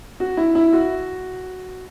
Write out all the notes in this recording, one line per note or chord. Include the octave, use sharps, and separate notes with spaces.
F#4
E4
E4
F#4